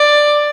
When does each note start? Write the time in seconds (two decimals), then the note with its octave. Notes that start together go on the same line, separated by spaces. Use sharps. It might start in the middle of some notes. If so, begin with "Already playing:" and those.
Already playing: D5